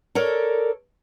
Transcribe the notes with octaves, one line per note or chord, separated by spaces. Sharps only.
A4 A#4 C#5 D5